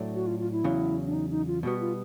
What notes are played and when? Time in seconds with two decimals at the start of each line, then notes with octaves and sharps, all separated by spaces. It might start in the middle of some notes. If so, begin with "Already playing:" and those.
Already playing: A2 F#3 A3 D4
0.15 F#4
0.27 F4
0.40 F4
0.52 E4
0.64 E2 C#3 F#3
1.07 D4
1.14 D#4
1.31 D#4
1.47 F4
1.63 B2 G3 B3 F#4
1.80 F4